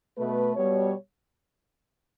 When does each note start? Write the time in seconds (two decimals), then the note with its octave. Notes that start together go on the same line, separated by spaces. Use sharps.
0.18 B2 A3 B4
0.55 B2 G3 C#5